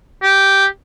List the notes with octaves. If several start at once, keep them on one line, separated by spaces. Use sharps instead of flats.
G4